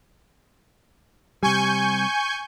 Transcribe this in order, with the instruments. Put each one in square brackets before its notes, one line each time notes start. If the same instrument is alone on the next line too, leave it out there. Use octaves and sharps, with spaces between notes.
[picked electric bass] C3 G3 [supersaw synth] G#5 C#6 G6